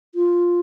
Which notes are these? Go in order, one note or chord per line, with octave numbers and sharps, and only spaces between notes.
F4